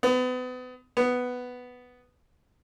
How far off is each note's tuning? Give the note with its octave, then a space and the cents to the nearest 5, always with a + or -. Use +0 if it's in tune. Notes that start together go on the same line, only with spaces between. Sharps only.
B3 +35
B3 +5